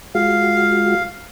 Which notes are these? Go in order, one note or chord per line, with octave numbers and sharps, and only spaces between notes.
G#3 F4 F#4 F5